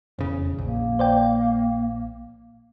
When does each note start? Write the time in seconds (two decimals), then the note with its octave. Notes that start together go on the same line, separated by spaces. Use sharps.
0.19 E1 F2 C#3
0.58 A#1 A#3
0.99 C5 D5 G5